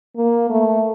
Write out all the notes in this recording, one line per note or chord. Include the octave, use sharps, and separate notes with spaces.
A#3
A3